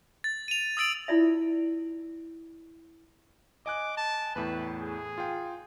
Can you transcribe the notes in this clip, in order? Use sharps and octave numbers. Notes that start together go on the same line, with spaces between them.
A6
D#7 F7
D#6 E6 A6 D7 F#7
E4 F4 D5 E5
D#5 G#5 D6 F#6
A5
E2 A2 B4
G#4
F4 G5